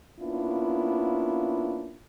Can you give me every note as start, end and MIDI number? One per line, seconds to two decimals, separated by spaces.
0.19 1.97 58
0.19 1.97 59
0.19 1.97 61
0.19 1.97 62
0.19 1.97 64
0.19 1.97 65